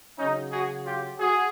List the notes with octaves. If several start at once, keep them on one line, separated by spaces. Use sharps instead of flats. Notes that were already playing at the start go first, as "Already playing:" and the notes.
C#3 F#3 C#4 D#4
F#4 G#4
F4 G4
F#4 G#4